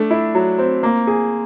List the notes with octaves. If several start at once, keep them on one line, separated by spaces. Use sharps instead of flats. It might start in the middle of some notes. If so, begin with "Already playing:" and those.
Already playing: A3 D4
E4
F#3
C4
A#3
G#4